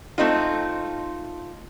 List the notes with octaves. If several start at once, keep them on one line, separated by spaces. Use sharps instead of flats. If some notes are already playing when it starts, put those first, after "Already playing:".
A3 C4 D#4 F4